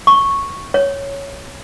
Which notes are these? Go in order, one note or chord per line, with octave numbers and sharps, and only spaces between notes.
C#6
C#5